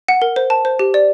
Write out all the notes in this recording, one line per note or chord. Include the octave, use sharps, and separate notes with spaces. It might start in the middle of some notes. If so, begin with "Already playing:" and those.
F#5
A#4
C5
A5
C5
G4
D5